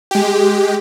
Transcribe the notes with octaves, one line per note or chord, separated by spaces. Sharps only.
G#3 G4